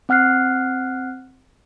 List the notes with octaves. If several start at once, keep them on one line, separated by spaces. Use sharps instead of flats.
C4 F#5 F6 F#6 C7